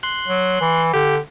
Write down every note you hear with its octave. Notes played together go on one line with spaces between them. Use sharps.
C6 F#6
F#3
E3
D3 G4